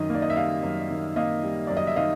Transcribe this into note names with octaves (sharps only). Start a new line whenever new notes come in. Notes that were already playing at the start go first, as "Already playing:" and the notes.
Already playing: F#2 D#3 D#5
A#3 D5
D#5
E5
G3 D#5 F5
F#2
D#3
A#3 D#5 F5
G3
F#2 D5
D#5
E5
D#3 D#5 F5